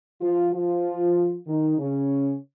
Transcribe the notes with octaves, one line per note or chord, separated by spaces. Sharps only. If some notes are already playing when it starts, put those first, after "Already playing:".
F3 F4
F3 F4
D#3 D#4
C#3 C#4